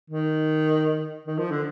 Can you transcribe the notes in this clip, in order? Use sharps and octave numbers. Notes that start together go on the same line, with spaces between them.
D#3
D#3
F3
D3